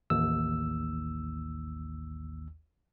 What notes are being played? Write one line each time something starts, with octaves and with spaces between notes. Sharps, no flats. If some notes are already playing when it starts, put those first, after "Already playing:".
A1 D#2 E6